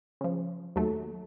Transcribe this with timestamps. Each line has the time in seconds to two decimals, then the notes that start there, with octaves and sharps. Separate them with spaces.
0.21 C#3 F3
0.76 D#2 F#3 A3